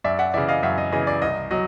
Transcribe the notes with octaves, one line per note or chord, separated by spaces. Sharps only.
F#2 D5 E5
E5 F#5
C#3 E3 D5 E5
D#5 F5
F#2 E5 F#5
D#5
C#3 E3 D#5
D5
C2 D#5
F#3 D#5